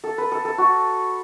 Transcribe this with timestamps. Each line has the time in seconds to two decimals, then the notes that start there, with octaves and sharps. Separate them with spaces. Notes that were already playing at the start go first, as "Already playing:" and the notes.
0.04 A4
0.18 B4
0.32 A4
0.45 A4
0.58 F#4